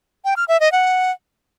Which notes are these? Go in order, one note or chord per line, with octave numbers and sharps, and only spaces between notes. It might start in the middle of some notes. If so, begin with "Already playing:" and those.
G5
F6
E5
D#5
F#5